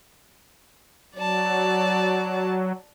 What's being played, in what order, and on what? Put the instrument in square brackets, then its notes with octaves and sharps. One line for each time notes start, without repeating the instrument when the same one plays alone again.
[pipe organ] F#3 [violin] D5 A5